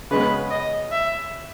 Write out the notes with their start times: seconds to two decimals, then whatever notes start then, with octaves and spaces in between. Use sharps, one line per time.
0.11 C#3 G#3 B3 B4
0.51 D#5
0.92 E5